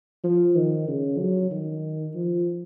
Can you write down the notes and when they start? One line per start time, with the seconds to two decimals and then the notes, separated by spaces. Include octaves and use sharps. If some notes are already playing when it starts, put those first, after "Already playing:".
0.24 F3
0.56 D#3
0.88 C#3
1.19 F#3
1.51 D#3
2.15 F3